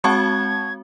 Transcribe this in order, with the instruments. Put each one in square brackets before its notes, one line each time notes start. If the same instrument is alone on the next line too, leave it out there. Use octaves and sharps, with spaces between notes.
[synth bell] G#3 C4 F#4 [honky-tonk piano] F#5 A5 C#6 [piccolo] G#6